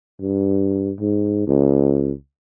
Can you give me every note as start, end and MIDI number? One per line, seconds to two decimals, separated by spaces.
0.20 0.91 43
1.00 1.47 44
1.47 2.11 37